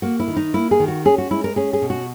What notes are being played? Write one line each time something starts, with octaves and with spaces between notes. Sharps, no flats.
A#3 F#4
E4
D#3
D#4
A#3 E4
G#4
D#3
F#4
C#4 G#4
F#4
G#3 E4
A#4
C#4 G#4
G#4
B2
F#4